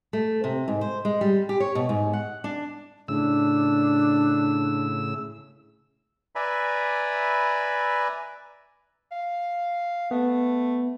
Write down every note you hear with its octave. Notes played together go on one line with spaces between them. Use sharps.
A3
C3
G#2
C5
G#3
G3
G4
C#5
B2
G#2
F#5
D4
A2 C#3 D4 E6
B4 D5 E5 G#5 A#5 B5
F5
A3 B3